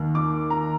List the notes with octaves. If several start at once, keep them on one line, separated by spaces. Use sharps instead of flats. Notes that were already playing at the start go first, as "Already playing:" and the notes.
Already playing: D#2 D#3 A#3
D6
A#5